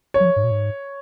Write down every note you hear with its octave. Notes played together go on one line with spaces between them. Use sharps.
C#5
F#3
F3
G#2
A#2
G#2